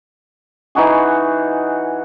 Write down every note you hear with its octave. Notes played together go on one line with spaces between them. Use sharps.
E3 D#4 F#4 G#4